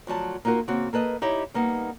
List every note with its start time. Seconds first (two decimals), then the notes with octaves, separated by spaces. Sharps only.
0.07 D2 F3 F#3 A5
0.45 A#3 D#4 F4 F#4 A#4
0.68 C#3 A#3 C4 F#4
0.93 A#3 A4 B4 D#5
1.22 D#4 E4 G4 C#5 D#5
1.54 G3 A#3 B3 D#4